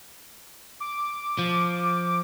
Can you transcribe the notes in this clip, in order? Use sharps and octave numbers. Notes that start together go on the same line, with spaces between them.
D6
F3